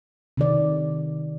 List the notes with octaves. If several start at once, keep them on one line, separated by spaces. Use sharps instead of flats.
C3 D#3 D5